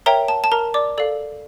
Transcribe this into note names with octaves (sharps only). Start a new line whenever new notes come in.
A#4 C#5 E5 G5 A#5
A5
A5
A#4 A#5
D5 D6
A4 D5 F5